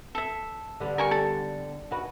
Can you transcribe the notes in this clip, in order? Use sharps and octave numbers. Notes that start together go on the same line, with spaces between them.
A4 E5
D3 G3 B3
A#4 G#5 C#6
A4
D#2 F#4 B4